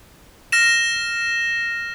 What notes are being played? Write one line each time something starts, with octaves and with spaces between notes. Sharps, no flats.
F6 A#6 E7